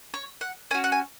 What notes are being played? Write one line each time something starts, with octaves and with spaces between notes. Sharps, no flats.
C#5
F#5
C#4 F#4 G#5
F#5
G#5